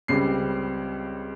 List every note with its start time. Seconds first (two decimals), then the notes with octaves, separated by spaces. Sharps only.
0.08 C#2 C#3 G3 C4 C7